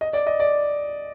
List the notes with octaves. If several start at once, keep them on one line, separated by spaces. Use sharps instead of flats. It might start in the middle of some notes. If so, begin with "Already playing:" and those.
D#5
D5
D#5
D5